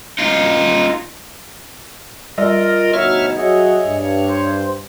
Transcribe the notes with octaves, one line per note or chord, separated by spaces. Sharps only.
D#4 F4
G3 F4 A#4 D5 D#5
D2 B2 B3 D#4 C#5 E5 F6
F#3 F#4 G#4 C#5 D#5 E5
G2
C5